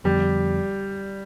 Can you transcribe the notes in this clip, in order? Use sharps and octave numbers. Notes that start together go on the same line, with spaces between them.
F2 D3 F3 G3 B3